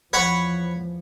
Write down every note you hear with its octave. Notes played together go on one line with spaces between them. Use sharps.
E2 F3 C#5 F#5 B5